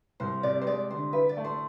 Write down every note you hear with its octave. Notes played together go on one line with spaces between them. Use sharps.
C2 C5
C3 D5
C5
G#3 D5
D3 C5
E4 B4
D5
A3
C5